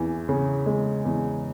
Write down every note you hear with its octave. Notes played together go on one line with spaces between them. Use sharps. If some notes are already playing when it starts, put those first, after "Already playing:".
Already playing: E2 E3
C#3
G#3
E2